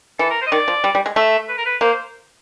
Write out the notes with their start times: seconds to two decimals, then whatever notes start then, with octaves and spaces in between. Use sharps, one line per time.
0.19 E3 A4
0.30 A#4
0.41 C5
0.47 D#5
0.51 D#3 D5
0.68 F3
0.84 G3
0.95 G3
1.06 G#3
1.16 A3 E5
1.49 B4
1.58 A#4
1.66 B4
1.81 A#3 C5
1.92 C5